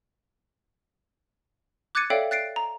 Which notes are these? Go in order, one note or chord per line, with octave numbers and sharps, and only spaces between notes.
D6 F#6 G#6 A6 C#7 D#7
A4 C#5 D5 E5 F5 G5
F#6 A6 C7 D7
A#5